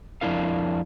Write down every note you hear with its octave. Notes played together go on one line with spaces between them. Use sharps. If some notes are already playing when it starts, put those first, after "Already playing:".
F2 C4 D4 E4 A#4 F5